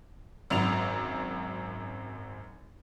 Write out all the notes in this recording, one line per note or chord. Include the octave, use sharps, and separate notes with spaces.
G#1 F#2 F7